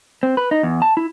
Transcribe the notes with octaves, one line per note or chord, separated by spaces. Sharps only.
C4
B4
D#4
E2
A5
E4